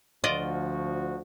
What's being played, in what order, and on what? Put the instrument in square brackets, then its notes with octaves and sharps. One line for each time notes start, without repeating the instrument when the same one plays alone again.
[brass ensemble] D2 F3 F#4 [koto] F4 D5 D#5